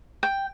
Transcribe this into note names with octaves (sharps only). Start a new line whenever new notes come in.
G5